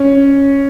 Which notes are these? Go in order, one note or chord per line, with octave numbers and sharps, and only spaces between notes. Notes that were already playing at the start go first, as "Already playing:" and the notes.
Already playing: C#4